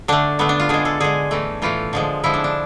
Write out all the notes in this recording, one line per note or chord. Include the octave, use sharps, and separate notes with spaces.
D3 A3 D4
D3 A3 B3
D4
F4
D3 G#3 G#4
A4
D3 G#3 G#4
A2 E3 A3
A2 E3 A3 F4
D3 F3 G#3
D3 F3 G#3 E4
D4
D4